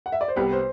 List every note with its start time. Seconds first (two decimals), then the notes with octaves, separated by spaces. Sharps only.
0.06 F#5
0.12 E5
0.21 D5
0.28 C5
0.36 C2 C3 G3 B3 B4
0.52 C5